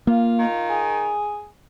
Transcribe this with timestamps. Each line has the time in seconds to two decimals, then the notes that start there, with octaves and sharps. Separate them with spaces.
0.07 A#3 F4
0.38 D#3
0.69 G#4